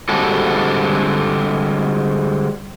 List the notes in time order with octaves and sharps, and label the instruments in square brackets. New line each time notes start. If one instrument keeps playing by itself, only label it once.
[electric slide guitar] D3 G3 G#3 C4 F#4 A4